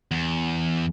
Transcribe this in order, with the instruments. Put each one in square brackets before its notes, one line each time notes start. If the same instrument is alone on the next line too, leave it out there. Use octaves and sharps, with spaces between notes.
[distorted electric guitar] E2